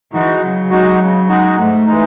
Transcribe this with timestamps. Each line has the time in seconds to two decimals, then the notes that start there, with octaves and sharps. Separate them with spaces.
0.12 E3 G#3 D#4 F#4
0.41 C#3 F#3
0.70 G#3 D#4 F#4
0.99 C#3
1.29 G#3 D#4 F#4
1.56 G#2 A3
1.86 E3 G#3 D#4